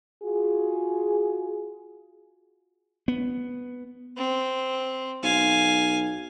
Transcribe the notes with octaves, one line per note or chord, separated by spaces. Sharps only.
F4 F#4 G#4
B3
C4
B1 F5 G#5